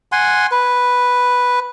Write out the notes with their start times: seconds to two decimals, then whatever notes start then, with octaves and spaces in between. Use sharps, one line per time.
0.12 F#5 G#5 C6
0.51 B4